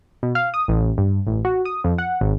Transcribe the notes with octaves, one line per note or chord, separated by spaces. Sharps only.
B2
F5
D#6
A1
G2
A1
F#4
D#6
F2
F#5
G#1